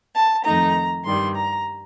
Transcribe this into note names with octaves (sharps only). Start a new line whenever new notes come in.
A5
F2 D#3 A3 D#4 A#5
G2 D#3 G3 C6
A#5